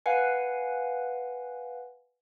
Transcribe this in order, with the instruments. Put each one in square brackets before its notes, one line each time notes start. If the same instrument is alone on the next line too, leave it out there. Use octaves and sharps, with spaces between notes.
[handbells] B4 F5 F#5 G#5